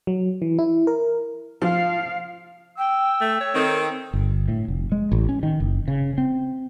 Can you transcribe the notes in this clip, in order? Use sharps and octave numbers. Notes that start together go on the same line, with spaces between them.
F#3
E3
E4
A#4
F3 F4 F5
G5 E6
A3
C#5
D#3 C4 A4
G1
A2
F1
G#3
A1
C#4
D#3
F#1
C#3
C4